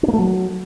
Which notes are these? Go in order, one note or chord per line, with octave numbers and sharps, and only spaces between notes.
D4
A#3
A3
F#3